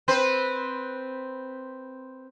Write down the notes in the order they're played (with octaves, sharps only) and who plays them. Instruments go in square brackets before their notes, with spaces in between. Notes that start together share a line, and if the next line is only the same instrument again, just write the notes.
[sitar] C4 B4 C5